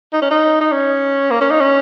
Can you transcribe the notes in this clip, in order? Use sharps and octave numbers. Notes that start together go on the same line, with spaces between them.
D#4
C#4
D#4
D#4
C#4
A#3
C#4
D#4
C#4